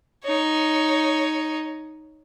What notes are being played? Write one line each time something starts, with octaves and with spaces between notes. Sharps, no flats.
D#4 C#5